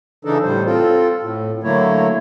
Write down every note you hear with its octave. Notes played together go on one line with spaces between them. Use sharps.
C#3 E3 D4 D#4 A4
A2 G3 C5
C4 F4 A4
A2
D3 F#3 A3 A#3 E4 C#5